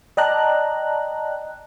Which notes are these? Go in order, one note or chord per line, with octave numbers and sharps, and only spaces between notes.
D5 D#5 G5 A5 A#5 F#6